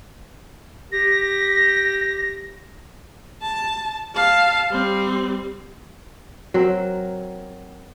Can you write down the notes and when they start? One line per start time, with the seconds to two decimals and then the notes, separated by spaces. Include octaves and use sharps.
0.92 G4 A#6
3.42 A5
4.15 F5 A5
4.70 G3 C4
6.54 F#3 C4 A#4